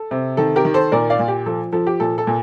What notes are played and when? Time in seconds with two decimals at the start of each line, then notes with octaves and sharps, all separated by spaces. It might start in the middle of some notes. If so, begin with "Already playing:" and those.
Already playing: A4
0.11 C3
0.37 D#3 A4
0.56 G4 A#4
0.65 D#3
0.74 A4 C5
0.92 A#2 A#4 D5
1.10 D5 F5
1.19 A#2
1.28 G4
1.46 F3 A4
1.72 F3 A4
1.87 G4
2.00 A#2 A4
2.18 A4
2.27 A#2